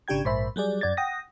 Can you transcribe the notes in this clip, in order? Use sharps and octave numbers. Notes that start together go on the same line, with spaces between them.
G#1 C#3 D4 G4 G5 G#6
A#1 G#2 C5 E5 B5
F#3 G3 G#4 D5
F#2 D5 G#6 A6
F#5 G5 D#6 A#6